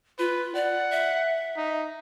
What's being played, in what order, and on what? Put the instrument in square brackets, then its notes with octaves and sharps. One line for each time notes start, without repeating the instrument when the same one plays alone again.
[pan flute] F4 [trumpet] B4
[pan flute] D5 [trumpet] F#5
[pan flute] E5
[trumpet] D#4